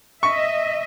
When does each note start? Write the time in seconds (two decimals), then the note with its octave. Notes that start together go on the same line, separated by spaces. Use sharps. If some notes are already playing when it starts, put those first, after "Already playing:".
0.23 D#5 E5 C#6